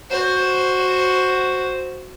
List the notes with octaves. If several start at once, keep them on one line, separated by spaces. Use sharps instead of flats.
F#4 C5